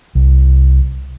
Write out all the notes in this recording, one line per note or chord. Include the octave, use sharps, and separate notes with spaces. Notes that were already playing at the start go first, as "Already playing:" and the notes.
C2